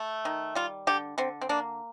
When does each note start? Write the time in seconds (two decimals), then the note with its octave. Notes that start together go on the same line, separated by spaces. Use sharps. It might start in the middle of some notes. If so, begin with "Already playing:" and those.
Already playing: A3
0.25 D#3
0.55 G3 F4
0.87 D3 G4
1.18 D3 C4
1.41 C4
1.49 A#3 D4